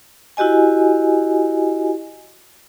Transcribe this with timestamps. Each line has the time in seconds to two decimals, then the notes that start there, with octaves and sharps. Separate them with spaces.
0.37 E4 F#4 G4 D#5 G#5